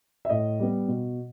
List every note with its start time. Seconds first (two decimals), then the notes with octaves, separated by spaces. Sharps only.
0.25 E5
0.29 A2 D#5
0.60 G3 B3
0.88 B2